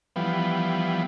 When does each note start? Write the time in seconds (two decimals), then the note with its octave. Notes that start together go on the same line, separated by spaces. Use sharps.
0.16 E3 F3 G3 B3